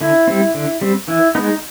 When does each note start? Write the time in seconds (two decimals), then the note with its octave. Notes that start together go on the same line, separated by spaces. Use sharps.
0.01 D3 E4
0.28 G3 C4
0.55 D3
0.81 G3 C4
1.08 E3 E4
1.35 G#3 B3 D#4